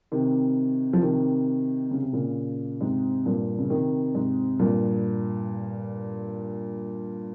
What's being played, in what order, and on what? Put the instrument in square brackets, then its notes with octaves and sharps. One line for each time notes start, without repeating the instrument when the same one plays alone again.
[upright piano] C3 D#3
F3
C3 D#3
C#3
C3
A#2 C#3
G#2 C3
G2 A#2
C#3
C3 D#3
G#2 C3
G2 A#2